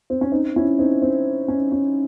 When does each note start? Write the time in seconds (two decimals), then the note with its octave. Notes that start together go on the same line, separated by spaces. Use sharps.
0.10 C4
0.21 C#4
0.32 C4 D#4
0.56 C#4 E4
0.79 C4 D#4
1.02 C4
1.48 C#4
1.72 C#4